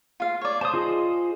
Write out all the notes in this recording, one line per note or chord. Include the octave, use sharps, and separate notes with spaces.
F4 F5
C#5 D5
C5 A5 D#6
F4 G#4 D#5